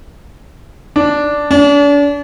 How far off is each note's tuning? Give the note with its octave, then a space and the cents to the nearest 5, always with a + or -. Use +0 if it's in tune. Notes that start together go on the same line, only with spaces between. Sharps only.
D4 -5
D4 -40